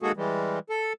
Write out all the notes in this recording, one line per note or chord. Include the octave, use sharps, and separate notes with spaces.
D#3 G#3 A#3 F#4 G#4 A4
E3 G3 G#3
A4